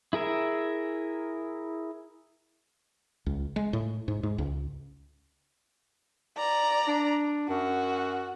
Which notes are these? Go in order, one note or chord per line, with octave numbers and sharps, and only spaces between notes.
E4 G#4 A#4 E5
C#2
G#3
A2
G#2
G#2
C#2
D5 A#5
D4
F#2 F#4